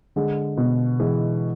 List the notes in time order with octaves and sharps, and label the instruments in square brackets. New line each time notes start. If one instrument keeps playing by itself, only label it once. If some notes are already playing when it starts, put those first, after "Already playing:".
[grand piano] D3 [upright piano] G#3
[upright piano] B2
[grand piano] E3 [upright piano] G#3